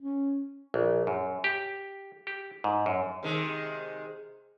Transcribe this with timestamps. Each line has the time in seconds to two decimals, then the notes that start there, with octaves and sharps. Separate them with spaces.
0.01 C#4
0.74 A#1
1.07 F#2
1.44 G4
2.27 G4
2.64 G#2
2.86 F#2
3.23 C3 D#3 G#3